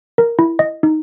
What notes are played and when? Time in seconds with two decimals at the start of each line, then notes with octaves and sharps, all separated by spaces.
0.18 A#4
0.39 E4
0.59 D#5
0.83 D#4